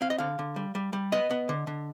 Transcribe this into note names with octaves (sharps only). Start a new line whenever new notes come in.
C4 F5
D#5
D3 F5
D3
G3
G3
G3
B3 D#5
B3
D3
D3